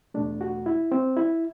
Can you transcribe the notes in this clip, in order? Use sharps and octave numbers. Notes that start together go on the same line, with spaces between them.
E2 B2 A3 D4
F#4
E4
C4
E4